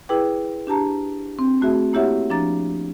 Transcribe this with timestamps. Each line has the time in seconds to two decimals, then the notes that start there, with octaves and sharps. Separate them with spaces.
0.09 E4 G#4 B4 G5 D6
0.67 D4 G4 A5 A#5
1.39 C4
1.62 A3 F#4 G#4 E5
1.93 A#3 E4 G4 C#5 E5 F#5
2.30 F3 D4 A#5 A6